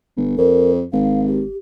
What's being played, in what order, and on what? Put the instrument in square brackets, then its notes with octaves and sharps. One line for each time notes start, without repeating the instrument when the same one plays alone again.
[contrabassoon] G1
[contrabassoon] F2 [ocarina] A#4
[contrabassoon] G#1 [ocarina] F5
[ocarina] G4